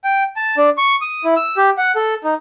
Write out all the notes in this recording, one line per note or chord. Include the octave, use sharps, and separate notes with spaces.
G5
A5
D4
C#6
D#6
E4
E6
G4
F#5
A4
D#4